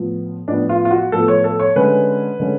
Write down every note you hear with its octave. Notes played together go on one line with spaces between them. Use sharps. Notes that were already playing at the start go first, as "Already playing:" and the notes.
Already playing: A2 F3 B3
A2 F3 B3 D4
F4
F4
F#4
A2 F3 B3 A4
C#5
A4
C#5
D3 G#3 C#4 B4
D3 G#3 C#4